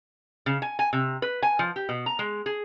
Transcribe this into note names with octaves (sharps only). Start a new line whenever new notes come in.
C#3
G#5
G#5
C3
B4
G#5
F3
G4
B2
A#5
G#3
G#4